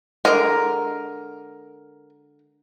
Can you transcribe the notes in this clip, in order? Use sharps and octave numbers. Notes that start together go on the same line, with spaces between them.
D3 G#3 A#4